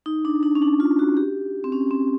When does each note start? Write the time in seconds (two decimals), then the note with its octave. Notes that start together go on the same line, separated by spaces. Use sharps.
0.06 D#4
0.25 D4
0.43 D4
0.55 C#4
0.62 D4
0.80 F4
0.99 F#4
1.17 G4
1.64 C4
1.72 C#4
1.91 C4